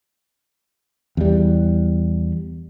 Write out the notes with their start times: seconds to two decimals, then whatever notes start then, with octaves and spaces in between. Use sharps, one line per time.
1.17 E2 G3